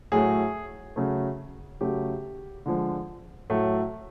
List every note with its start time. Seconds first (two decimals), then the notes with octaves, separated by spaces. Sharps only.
0.12 A2 F#3 A3 G#4
0.96 C#3 F#3 A3
1.81 C#3 F#3 A3 G4
2.66 D3 F3 G#3
3.50 A2 F#3 A3